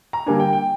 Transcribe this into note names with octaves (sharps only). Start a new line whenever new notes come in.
A#5
D3 G3 A#3 D4 G#5
G5
G5